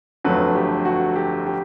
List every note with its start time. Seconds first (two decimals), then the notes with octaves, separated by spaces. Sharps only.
0.24 G1 F2 D3 F#3 A3 B4
0.55 G4
0.85 F#4
1.16 G4
1.46 G4